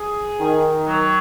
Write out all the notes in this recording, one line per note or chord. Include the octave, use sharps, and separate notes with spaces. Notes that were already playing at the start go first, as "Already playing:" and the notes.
Already playing: G#4
D#3
F#3